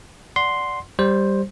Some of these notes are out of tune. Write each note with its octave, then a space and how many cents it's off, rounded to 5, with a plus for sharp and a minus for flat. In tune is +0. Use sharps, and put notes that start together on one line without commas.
D5 +0 F#5 +0 C6 +0
G3 +0 C5 +10